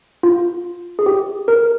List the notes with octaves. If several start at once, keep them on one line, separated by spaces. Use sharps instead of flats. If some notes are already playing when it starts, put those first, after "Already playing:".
F4
G#4
G4
A#4